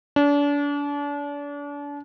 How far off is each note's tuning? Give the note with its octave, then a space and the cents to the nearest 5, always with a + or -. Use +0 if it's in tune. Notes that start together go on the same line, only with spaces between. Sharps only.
D4 -35